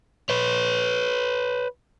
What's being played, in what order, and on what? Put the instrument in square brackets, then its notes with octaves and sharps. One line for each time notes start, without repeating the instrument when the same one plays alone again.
[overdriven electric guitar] B4 C#5